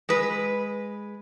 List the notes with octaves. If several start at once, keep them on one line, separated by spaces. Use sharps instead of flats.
G#3 B4